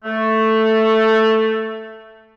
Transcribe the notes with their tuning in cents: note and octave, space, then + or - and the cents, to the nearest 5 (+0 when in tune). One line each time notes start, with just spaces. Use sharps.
A3 +5